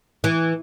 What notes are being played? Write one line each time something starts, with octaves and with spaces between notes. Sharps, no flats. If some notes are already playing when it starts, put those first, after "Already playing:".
E3